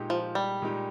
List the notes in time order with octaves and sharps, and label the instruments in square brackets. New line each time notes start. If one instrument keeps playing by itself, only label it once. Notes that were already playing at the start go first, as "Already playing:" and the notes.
Already playing: [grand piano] A#2 G#3 D#4 G4
[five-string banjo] F3
G3
[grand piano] A#2 G#3 D#4 G4